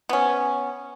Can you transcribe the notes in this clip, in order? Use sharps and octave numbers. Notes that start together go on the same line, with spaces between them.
B3 C#4